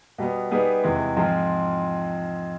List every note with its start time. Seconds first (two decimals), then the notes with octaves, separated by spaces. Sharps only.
0.18 B2 G3 B3
0.51 G3 B3 D#4 G#4 B4
0.84 E2 C3 E3 G#3
1.16 G#2 F3 G#3 C4 F4